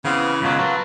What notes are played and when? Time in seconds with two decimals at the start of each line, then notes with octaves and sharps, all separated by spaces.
0.05 C#3 E3 B3 C4 F5
0.42 C#2 B2 F#3 A#3 F4
0.59 F#3 B4 A5